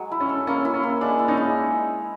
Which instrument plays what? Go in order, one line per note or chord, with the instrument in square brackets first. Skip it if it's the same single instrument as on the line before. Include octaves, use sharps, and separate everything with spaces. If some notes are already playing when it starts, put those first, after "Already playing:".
Already playing: [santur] F#3 G#3
E4
[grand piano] C#4
[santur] A4
[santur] A#3 [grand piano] C#4
[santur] E4
[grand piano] C#4
[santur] A#3
[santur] G#3 [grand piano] D4
[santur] E4
[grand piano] C#4 D#4
[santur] G#3